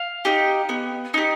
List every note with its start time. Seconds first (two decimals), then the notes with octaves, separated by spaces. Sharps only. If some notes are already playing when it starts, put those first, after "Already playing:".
Already playing: F5
0.25 D#4 G4
0.69 B3
1.14 D#4 G4